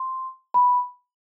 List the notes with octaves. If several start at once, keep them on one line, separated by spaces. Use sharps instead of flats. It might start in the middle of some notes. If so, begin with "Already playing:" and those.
Already playing: C6
B5